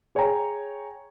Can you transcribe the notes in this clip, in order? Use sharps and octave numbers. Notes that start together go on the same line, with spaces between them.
G#4 C#5 G5 G#5 A#5